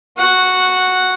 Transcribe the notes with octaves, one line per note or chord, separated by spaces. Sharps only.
F#4 F#5